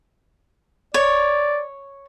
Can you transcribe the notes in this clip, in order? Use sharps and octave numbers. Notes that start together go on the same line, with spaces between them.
C#5 D5